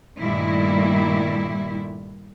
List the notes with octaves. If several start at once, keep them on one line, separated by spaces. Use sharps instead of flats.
G2 A#2 D#3 G3 A3 E4